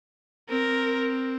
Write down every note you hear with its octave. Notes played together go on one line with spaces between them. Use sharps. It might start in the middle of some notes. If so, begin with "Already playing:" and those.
C4 A#4